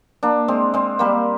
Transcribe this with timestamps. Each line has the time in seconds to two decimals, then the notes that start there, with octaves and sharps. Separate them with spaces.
0.23 A#3 D4
0.48 G#3 C4
0.74 G#3 C4
0.99 G3 A#3